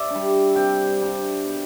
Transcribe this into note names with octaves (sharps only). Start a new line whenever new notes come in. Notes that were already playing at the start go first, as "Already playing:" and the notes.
Already playing: D5 E5
G3 D4
C3 G5
G3 D4
B2